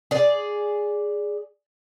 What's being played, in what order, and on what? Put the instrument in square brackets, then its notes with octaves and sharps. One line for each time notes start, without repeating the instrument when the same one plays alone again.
[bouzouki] G#4 D5